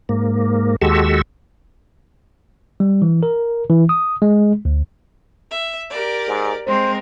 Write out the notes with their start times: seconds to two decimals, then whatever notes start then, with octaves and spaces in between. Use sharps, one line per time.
0.09 G#2 A#3
0.82 D#2 G#3 F#4 G4 A4 E6
2.80 G3
3.02 E3
3.23 A#4
3.70 E3
3.89 D#6
4.22 G#3
4.65 D2
5.50 E5
5.90 G4 A#4 D5
6.27 G#2
6.66 G#3 C4 A#4 C5